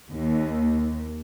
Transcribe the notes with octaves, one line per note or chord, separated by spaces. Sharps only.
D#2